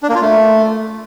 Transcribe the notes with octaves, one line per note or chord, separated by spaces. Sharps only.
D4
A#3
F4
A3